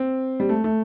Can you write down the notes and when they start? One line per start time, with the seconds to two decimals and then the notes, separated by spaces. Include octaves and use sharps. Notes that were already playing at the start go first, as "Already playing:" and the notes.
Already playing: C4
0.40 G3
0.49 A3
0.64 A3